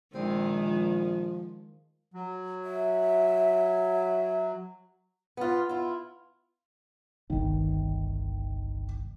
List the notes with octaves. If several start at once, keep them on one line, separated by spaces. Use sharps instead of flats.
A#1 D#3 G#3 C4
F3
F#3
E5
B3 F4
E4 F4
G1 C2 D#3